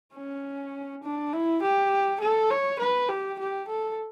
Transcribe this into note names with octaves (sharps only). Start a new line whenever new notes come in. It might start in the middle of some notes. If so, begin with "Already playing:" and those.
C#4
D4
E4
G4
A4
C#5
B4
G4
G4
A4